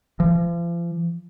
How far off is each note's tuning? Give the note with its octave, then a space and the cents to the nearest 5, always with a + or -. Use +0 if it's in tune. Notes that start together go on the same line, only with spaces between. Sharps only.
F3 -40